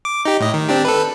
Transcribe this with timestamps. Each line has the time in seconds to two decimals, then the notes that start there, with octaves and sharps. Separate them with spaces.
0.05 D6
0.25 D#4 G4
0.40 A2 D#5
0.54 D#3
0.69 C4 D4 G4
0.85 A4 B4